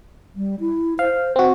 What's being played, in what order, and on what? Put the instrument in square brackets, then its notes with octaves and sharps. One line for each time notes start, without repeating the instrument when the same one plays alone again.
[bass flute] G3
E4
[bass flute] C5 [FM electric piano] F5
[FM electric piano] C4 F#4